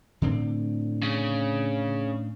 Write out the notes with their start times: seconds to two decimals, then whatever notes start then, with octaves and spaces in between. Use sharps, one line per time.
0.22 A2 D3 C4
1.03 C#3